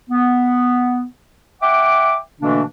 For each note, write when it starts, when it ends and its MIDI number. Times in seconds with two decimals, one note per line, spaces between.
0.10 1.03 59
1.62 2.15 76
1.62 2.15 78
1.62 2.15 79
1.62 2.15 86
2.41 2.62 47
2.41 2.62 50
2.41 2.62 52
2.41 2.62 57
2.41 2.62 58
2.41 2.62 62